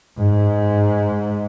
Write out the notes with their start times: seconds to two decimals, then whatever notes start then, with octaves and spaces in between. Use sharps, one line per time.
0.18 G#2